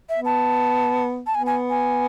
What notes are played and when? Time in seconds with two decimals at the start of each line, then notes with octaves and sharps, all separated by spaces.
0.09 E5
0.18 B3
0.25 A5
1.26 A5
1.35 B3 G#5
1.46 G#5
1.70 G#5